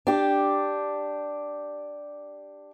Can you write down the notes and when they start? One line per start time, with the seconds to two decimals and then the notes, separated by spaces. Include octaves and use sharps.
0.07 D4 G4